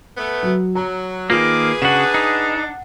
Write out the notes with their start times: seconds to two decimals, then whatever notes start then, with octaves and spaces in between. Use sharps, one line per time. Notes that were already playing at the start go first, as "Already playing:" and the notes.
0.18 A3 B3
0.43 F#3
0.75 F#3 A#5
1.30 D#3 A#3 F4 G#4 B4 D6
1.82 C#3 D4 F#4 F#5 E7
2.14 D#4